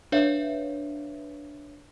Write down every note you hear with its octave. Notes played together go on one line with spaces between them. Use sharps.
D4 B4 C#5 E5 F5